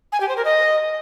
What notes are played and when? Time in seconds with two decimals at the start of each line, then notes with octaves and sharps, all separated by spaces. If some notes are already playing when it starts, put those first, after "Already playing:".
0.12 G#5
0.20 G4
0.28 C5
0.37 A#4
0.45 D#5